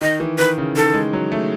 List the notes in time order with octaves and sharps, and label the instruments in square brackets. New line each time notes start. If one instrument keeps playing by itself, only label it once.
[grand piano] D#3 [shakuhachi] D#5
[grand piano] E3
[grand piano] D#3 [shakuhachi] B4
[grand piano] C#3
[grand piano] D#3 [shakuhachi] A4
[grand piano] G#3
F#3
A3